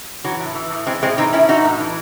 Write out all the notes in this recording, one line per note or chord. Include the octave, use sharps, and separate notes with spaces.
E3 F#3
A2
E3
A2
E3 G#3 C4
A2 G#3 C4
E3 C4 D#4
A2 C#4 E4
E3 D#4 F#4
A2
E3